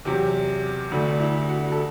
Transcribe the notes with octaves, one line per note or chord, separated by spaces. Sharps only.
E2 C3 F#3 G4
D2 D3 A3
D4
E4
F#4
A4